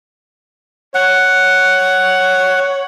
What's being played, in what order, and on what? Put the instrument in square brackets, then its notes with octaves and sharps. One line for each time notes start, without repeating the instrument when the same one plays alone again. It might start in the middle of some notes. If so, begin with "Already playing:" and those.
[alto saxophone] C#5 [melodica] F#5